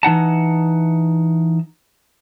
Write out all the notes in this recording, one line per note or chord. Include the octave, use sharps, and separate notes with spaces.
E3 D#4 F#5 A5